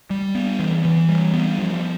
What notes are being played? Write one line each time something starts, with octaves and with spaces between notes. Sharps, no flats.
G3
B3
E3
E3
G3
B3
F3